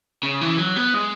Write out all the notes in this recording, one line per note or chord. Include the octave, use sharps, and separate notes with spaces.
C#3
E3
F#3
B3
G#3